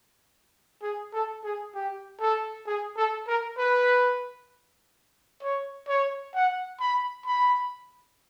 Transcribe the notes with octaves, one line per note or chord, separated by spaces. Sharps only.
G#4
A4
G#4
G4
A4
G#4
A4
A#4
B4
C#5
C#5
F#5
B5
B5